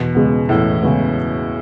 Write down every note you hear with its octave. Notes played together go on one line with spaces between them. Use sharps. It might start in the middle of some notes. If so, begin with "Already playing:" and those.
Already playing: E2 B2
C#3 G#3 B3
E2 A2
C#3 G#3 B3